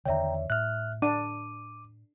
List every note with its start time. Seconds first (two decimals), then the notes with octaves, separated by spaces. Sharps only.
0.06 E2 D3 D#3 C#5 D5 E5 G5 A#5
0.50 A2 E5 F6 F#6
1.02 D4 D6 D#7